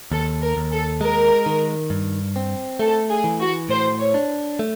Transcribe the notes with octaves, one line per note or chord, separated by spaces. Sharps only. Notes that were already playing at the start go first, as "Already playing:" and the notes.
D#2 A4
A#4
D#2
A4
G#3 A#4
D#3
G2
C4
A3 A4
G#4
E3
F#4
A2 C5
C#5
D4
A3